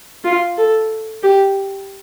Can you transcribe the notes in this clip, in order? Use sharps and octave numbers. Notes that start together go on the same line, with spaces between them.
F4
A4
G4